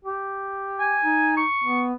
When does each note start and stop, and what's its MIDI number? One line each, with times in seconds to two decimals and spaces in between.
0.04 0.99 67
0.79 1.37 80
1.04 1.43 63
1.37 1.83 85
1.64 1.93 59